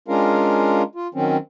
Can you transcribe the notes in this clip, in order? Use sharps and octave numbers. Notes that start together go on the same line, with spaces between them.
G#3 C#4 D4 F4 A#4 F5
F4
D#3 F#3 C4 C#4